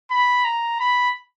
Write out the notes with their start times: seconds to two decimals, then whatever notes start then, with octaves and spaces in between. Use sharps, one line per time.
0.11 B5
0.45 A#5
0.80 B5